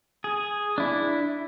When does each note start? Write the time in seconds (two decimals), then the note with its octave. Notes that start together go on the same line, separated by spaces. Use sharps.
0.24 G#4
0.78 D4 E4